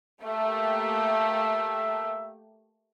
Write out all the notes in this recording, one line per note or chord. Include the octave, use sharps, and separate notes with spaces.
A3 A#3 G4 E5